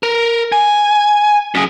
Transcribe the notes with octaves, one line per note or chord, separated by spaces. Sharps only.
A#4
G#5
F#2 G#4